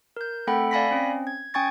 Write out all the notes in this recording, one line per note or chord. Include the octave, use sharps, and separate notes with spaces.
A#4 G6
A3 C4 A4 F#5 G5 B5
D5 F5 G#5 B5 A#6 B6
C4 C#4
G#6
C#4 G5 G#5 C#6 G#6 A6